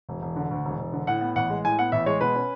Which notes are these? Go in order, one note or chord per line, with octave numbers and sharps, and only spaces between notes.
E1
E1
D3
D2
E1
E1
D3
A2 F#5
B3
A1 F#5
G#3
A2 G#5
B3 F#5
A1 E5
G#3 C#5
B2 B4
C#4